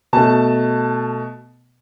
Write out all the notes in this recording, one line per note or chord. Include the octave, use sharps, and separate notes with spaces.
B2 A3 A5